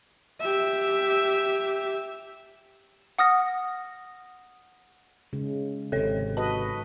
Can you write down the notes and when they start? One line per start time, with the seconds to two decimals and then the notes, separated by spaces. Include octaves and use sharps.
0.41 G4 E5
3.19 F#5 D#6 F6 A#6
5.33 C#3 G#3
5.92 G#1 C3 A4 C#5
6.37 F#4 B4 D#5 A5